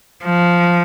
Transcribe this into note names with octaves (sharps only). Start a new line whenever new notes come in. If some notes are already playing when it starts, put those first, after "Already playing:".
F3